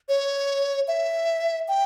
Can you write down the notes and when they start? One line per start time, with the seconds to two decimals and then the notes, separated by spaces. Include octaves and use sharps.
0.09 C#5
0.88 E5
1.68 G5